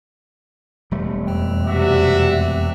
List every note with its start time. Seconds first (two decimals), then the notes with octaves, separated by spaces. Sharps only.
0.91 E1 G3 A3
1.27 F2 G5
1.66 C3 F#4 D5 E5